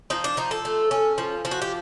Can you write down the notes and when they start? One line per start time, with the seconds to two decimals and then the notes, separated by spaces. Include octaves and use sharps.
0.10 F3 D#4
0.24 D4
0.37 F3 D#4
0.51 A4
0.65 A3
0.91 C#4
1.18 F3
1.45 F3
1.51 F#4
1.62 G4